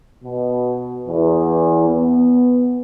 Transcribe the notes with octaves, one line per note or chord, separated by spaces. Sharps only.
B2
E2
B3